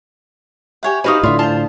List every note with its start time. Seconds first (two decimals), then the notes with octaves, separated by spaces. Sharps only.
0.83 G4 C#5 E5 F#5 G#5
1.04 D#4 F#4 G4 B4 C5 D#5 F5 D#6
1.23 A2 D3 F4 D5 E5
1.39 F4 C5 A5